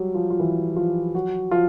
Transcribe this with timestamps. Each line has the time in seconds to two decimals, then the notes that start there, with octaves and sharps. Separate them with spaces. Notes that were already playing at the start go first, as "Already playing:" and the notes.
Already playing: F#3 G3 F#4 G4
0.14 F3 F4
0.30 F4
0.40 E3 E4
0.76 F3 F4
1.14 F#3 F#4
1.51 F3 F4